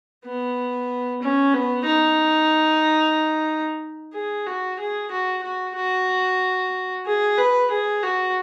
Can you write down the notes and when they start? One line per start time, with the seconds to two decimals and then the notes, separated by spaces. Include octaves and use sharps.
0.25 B3
1.22 C#4
1.55 B3
1.87 D#4
4.14 G#4
4.46 F#4
4.79 G#4
5.11 F#4
5.43 F#4
5.76 F#4
7.06 G#4
7.38 B4
7.71 G#4
8.03 F#4